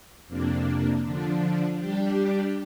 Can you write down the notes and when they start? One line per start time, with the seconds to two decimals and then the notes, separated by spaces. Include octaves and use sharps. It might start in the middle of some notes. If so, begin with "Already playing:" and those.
0.27 F2 C3 A#3 D4
1.03 D3 F3 D4
1.78 G3 D4 G4